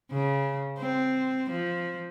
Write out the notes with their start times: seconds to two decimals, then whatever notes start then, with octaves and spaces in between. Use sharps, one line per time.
0.11 C#3
0.78 C4
1.50 F3